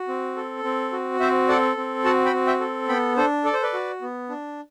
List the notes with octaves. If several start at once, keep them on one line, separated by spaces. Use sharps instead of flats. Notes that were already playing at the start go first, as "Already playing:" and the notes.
Already playing: F#4
C4
A4
C4
F#4
C4 C5 E5
A4 D5 F#5
C4
F#4 F#5 A5
G5 B5
C4
E5 G5
A4
B3 G5 B5
D4 A4 C5
A4 D5
C5
B4 D5
F#4
B3
D4